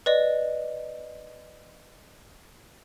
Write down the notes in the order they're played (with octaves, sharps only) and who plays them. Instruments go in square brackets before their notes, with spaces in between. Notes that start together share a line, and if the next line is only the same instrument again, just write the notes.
[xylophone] B4 D5 D#5